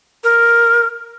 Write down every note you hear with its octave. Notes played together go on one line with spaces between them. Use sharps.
A#4